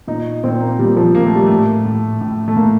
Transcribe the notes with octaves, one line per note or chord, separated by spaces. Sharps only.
A#2 D#4
A#2 C4
A#3
A#2 G3
F3
A#2 A#3
A3
G3
A2 A3
A2
A2
A3
A2 A#3